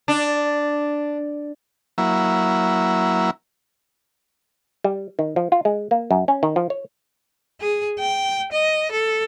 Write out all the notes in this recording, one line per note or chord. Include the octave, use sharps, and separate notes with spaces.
D4
F#3 A#3 E4
G3
D#3
F3
F4
G#3
A#3
F#2
C#4
D#3
F3
C#5
G#4
G5
D#5
A4